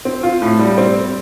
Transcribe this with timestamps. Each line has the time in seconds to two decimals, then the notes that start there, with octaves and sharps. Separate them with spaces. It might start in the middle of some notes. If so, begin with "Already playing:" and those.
0.05 C4
0.23 F4
0.42 A2
0.59 G3
0.78 C4